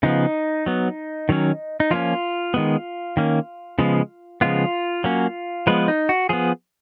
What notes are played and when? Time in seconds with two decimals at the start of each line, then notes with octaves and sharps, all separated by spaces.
0.03 C#3 F3 B3 D#4
0.66 F#3 B3
1.29 D#3 F#3 C#4
1.80 D#4
1.91 F3 A#3 C#4 F4
2.54 D#3 G#3 B3
3.17 D#3 A#3 C#4
3.79 C#3 F3 G#3 B3
4.41 C#3 F3 G#3 B3 F4
5.04 F#3 A#3 C#4
5.67 F3 G#3 B3 B4
5.88 D#4
6.09 F#4
6.29 F3 B3 G#4